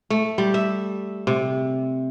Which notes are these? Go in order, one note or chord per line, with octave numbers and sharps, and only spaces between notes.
A3
G3
E5
C3